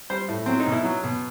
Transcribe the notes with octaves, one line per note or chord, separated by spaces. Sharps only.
G3 C5
A2
F#3 C4
D#4
B2
E4
F#3
B2